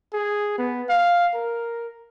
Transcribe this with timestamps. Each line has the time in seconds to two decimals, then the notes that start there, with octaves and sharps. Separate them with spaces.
0.14 G#4
0.58 B3
0.89 F5
1.35 A#4